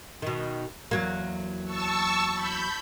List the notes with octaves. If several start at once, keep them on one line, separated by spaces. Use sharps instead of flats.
B2 D#3
E2 F#3 A#3
A5 C#6 E6
B5 G6